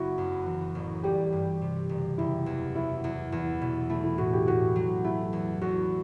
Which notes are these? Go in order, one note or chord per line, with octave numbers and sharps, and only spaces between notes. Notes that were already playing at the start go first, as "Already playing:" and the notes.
Already playing: F#1 B3 E4 F#4
F#2
E3
A1
G3 G4
G2
C3
F#1
F#1 E4
E2
F#3 E4
E2
E2
B2
A3 E4
E4
A2 F#4
G4
A2 F#4
F#3
A3 E4
E2
E2 F#4